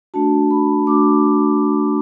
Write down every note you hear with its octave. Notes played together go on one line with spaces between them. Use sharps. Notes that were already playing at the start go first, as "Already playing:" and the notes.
A3 D4 F#4 A5
B5
A3 D4 F#4 D6